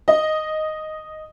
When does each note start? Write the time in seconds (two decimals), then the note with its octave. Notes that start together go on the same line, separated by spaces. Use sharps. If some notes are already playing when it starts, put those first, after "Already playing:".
0.08 D#5